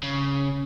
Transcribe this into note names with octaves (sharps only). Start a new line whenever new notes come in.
C#3